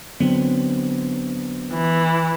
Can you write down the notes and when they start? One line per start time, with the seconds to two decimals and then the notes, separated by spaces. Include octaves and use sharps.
0.20 D3 F#3 B3 C4
1.73 E3